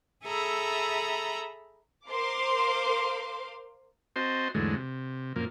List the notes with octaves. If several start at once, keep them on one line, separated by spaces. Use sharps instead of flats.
G#4 A4 E5 A#5 B5
A#4 C5 F5 C6 D6
C4 F#4 C5 D#5 A5 C6
E2 G#2 D3 F#3 G#3 A3
C3
F#2 A#2 F3 A#3